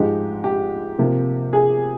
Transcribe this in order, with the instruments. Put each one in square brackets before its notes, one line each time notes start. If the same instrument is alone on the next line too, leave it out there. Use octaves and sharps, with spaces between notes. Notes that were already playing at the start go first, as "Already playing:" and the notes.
Already playing: [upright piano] G#2 F3 G#3 D#4 G4
G4
C3 F3 A#3
G#4